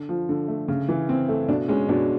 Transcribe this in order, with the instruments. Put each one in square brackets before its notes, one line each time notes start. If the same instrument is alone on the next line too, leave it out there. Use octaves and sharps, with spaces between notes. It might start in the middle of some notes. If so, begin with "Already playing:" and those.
Already playing: [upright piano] D3
F3
D3
A3
C#3
E3
C4
A3
B2 D4
G#3 C#4
B2 D4